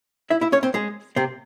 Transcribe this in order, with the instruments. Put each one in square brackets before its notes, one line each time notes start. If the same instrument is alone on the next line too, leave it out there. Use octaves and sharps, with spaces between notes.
[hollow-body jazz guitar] E4 E5
E4 E5
C#4 C#5
C4 C5
G#3 G#4
C3 C4